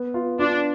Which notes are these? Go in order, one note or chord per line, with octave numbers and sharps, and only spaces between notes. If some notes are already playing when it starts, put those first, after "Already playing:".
Already playing: B3
F4
D4 F4